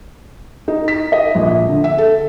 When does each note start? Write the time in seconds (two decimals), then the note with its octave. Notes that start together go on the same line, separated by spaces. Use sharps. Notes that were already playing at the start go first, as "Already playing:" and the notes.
0.68 D#4
0.88 B6
1.12 D#5
1.35 A#1
1.69 D3
1.84 E5
1.98 A4